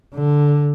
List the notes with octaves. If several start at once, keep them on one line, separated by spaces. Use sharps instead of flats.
D3